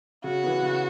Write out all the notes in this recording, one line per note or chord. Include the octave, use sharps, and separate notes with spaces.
C#3 F#4
E3 B3
C#3